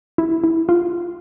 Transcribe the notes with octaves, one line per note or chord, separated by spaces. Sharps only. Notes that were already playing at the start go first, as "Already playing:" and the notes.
E4
E4
F4